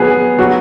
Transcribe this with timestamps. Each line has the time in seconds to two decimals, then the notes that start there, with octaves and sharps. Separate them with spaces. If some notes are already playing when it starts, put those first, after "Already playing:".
Already playing: F#3 B3 G#4
0.39 F#3 F#4